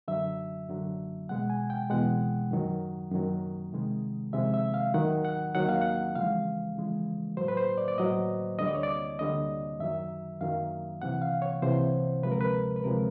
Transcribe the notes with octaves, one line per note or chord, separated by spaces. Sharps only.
F#2 D3 F#3 E5
F#2 D3 F#3
E2 B2 G#3 F#5
G#5
G5
E2 B2 G#3 F#5
F#2 D#3 F#3
F#2 D#3 F#3
F2 C3 D#3 G#3
F2 C3 D#3 G#3 E5
E5
F5
D#2 D#3 F#3 F#5
F#5
D#2 D#3 F#3 F#5
F5
F#5
F2 C#3 E3 G#3 F5
F2 C#3 E3 G#3
A2 F#3 C5
B4
C5
D5
D5
A2 F#3 D#5
D2 D3 G3 D#5
D5
C#5
D5
D2 D3 G3 D#5
F#2 D#3 F#3 E5
F#2 D#3 F#3 F5
C2 C3 E3 F#5
F5
C#5
C2 C3 E3 C5
D2 C3 F3 G#3 B4
A#4
B4
B4
D2 C3 F3 G#3 A#4